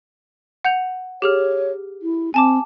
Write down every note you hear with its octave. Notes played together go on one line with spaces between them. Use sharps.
F#5 G6 F7
G4 G#4 C#5 F6
E4
C4 G#5 A5 D6